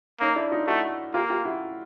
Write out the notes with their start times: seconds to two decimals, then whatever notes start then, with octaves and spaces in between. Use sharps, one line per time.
0.20 A#3 C#4 D#4
0.36 D4 E4
0.51 D#4 F4
0.67 A3 E4 F#4
1.14 A#3 F4 G4
1.30 F4 G4
1.45 E4 F#4